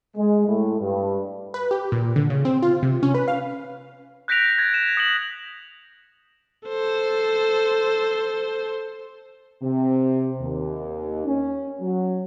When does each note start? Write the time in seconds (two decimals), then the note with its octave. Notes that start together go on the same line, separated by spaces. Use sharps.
0.16 G#3
0.47 A2
0.79 G2
1.54 B4
1.71 G4
1.92 A#2
2.16 D3
2.30 C#3
2.45 C4
2.62 F4
2.83 C3
3.03 C#4
3.15 B4
3.28 F5
4.28 F#6 G6 A#6 B6 D7 F7
4.58 G#6 A6
4.74 E7
4.97 D#6 C#7 F7 F#7
6.68 A4 C5
9.62 C3
10.41 D#2
11.25 C#4
11.80 F#3